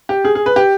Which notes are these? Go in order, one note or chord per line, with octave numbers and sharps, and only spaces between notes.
G4
G#4
G#4
B4
G4